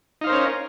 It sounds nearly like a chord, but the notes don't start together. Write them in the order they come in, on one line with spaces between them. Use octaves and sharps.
D#4 F5 C5 A#4 C#4